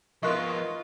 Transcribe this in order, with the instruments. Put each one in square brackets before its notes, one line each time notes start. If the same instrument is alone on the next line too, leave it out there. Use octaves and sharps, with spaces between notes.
[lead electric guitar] F3 B3 [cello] F4 [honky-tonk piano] A#4 D#5 [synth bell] C#6 F#6